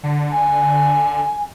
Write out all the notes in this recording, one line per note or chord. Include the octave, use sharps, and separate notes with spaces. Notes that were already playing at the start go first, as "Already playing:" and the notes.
D3
G#5